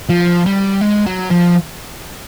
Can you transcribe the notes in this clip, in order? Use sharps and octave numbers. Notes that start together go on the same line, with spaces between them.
F3
G3
G#3
F#3
F3